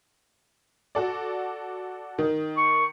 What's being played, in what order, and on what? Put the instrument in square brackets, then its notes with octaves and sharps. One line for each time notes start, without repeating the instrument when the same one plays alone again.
[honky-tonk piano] F#4 A4 D5
D#3
[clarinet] C#6